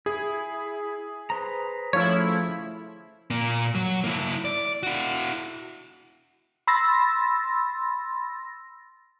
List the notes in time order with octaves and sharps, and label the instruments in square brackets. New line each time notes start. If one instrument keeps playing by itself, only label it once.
[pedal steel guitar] E4 [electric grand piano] G#4
[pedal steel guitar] B4 C5 A#5
[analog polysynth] F3 E4 [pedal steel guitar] A3 C#4 F4 [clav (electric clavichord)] C#5
[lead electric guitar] A#2 A#3
F#3
A#3 E4
D5
E4 F#4
[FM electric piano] B5 C6 E6 A6 A#6